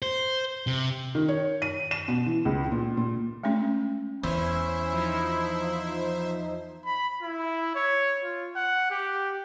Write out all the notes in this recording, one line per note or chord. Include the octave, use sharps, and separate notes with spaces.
C5
C3
D#3
C#5
D#7
E7
B2
E3
C#2
A#2
A#2
G#3 A3 C#4 D4
E2 C#4 E4 C5 E5
F3 D#4
B5
E4
C#5
F4
F#5
G4